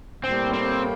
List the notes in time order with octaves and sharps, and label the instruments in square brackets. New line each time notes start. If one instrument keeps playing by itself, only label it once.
[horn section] A2 G3 A#3 [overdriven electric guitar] C4
[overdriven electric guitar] C4